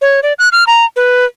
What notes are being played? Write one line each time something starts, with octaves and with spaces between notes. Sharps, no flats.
C#5
D5
F#6
F6
A#5
B4